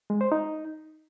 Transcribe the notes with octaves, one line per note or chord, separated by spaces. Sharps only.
G#3
C5
D#4